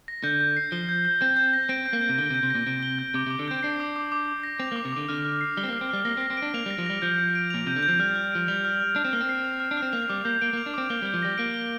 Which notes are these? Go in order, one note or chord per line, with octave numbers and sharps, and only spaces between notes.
A#6
D3 G6
G6
C7
F3 G7
G6
G6
C4 G6
G6
A#6
C4 D7
G6
A#3
G6
C3
D3 G7
C3
G6
C3
A#2 A#6
C3 D7
G7
G6
C3 D6
C3
D6
D3
C4 G6
D4 C7
D6
D6
D6
D6
A#6
C4 F7
A#3
D6
C3
D3 D6
D3 F6
F6
C7
G3 G7
C4
A#3
F6
C4
G3 F6
A#3 A#6
C4
A#6
C4
D7
D4
A#3 F7
G3
A#6
F3
G3 A#6
F3 G6
G6
D7
A#2 F7
C3 G6
D3
G6
F3
G3 F6
F6
F3 D7
G3 F7
F6
F6
D4 F6
C4
A#3 F6
C4
C7
F7
F6
D4
F6
C4
A#3 F7
G3 D6
A#3 G6
A#3 D7
A#3
F7
D4
C4 D6
A#3 G7
G3 G6
F3
G3 A#6
A#3 D7
G7